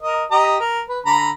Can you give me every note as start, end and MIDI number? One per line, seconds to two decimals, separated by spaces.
0.03 0.24 70
0.03 0.24 75
0.31 0.57 67
0.31 0.57 75
0.31 0.57 82
0.60 0.82 70
0.89 0.99 71
1.06 1.31 50
1.06 1.31 82
1.06 1.31 83